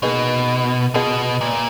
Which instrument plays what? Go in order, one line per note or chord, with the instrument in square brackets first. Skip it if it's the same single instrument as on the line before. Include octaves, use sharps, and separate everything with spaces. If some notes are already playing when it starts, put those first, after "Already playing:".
[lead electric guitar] B2 [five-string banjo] A#3 D#4 G#4 B4 D#5
[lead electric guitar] B2 [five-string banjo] B3 F4 G#4 D#5
[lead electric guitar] A#2